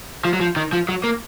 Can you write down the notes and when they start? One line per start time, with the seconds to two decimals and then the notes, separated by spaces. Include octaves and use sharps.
0.25 F3
0.33 F#3
0.40 F3
0.56 D#3
0.73 F3
0.89 F#3
1.04 A#3